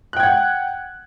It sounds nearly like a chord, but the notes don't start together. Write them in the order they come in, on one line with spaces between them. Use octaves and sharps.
F#6 G5 G#6 F#5